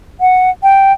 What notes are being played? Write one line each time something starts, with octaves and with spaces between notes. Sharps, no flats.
F#5
G5